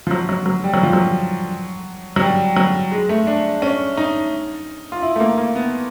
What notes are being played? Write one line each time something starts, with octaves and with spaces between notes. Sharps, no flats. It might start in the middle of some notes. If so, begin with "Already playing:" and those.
F3
F#3
F#3
F#3
G3
F#3
F3
F#3
F#3
G3
F#3
G#3
A3
D4
C#4
D#4
F4
E4
A3
A#3
A#3
B3